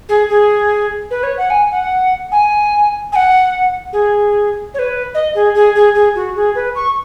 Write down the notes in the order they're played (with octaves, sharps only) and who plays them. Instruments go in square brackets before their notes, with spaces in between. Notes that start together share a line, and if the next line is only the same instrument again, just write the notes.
[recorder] G#4
G#4
B4
C#5
F#5
G#5
F#5
G#5
G#5
F#5
G#4
C#5
B4
D#5
G#4
G#4
G#4
G#4
F#4
G#4
B4
C#6